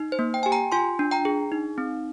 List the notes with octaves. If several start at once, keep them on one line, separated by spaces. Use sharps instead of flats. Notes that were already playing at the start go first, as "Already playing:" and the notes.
Already playing: D#4
C5
A#3
G5
G4 G#5
G5 A#5
F4 G#5 C6
D4
G5 A#5
G#4
D#4
C4